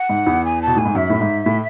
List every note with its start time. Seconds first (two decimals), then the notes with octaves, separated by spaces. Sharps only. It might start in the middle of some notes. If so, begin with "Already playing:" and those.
Already playing: F#5
0.09 G#2
0.27 E2
0.44 G#5
0.61 A5
0.67 B2
0.76 A2 G#5
0.85 G#2
0.95 F#2 E5
1.10 A2
1.21 G#2
1.46 A2